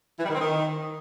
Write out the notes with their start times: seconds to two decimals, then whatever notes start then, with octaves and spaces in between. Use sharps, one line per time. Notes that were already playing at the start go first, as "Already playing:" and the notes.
0.19 E3
0.24 G3
0.30 D#3
0.35 C4
0.41 D#3